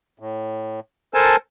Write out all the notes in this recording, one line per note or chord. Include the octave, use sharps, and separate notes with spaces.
A2
A4 A#4 C5 G#5 A5